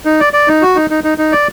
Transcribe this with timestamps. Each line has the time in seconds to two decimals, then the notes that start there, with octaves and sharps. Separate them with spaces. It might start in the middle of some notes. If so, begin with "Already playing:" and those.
0.05 D#4
0.20 D5
0.33 D5
0.48 D#4
0.62 F#4
0.76 D#4
0.90 D#4
1.04 D#4
1.18 D#4
1.32 D5